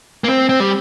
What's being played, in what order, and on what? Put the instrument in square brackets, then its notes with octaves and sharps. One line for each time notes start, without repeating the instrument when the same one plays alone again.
[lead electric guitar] A#3
C4
C4
G3